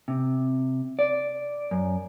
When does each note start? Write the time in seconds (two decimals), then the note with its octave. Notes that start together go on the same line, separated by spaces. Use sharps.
0.08 C3
0.99 D5
1.71 F#2